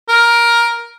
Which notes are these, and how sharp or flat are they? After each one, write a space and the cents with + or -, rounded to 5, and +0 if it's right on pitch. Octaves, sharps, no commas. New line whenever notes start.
A#4 +10